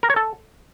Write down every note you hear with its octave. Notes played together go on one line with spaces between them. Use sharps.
A#4
C#5
A4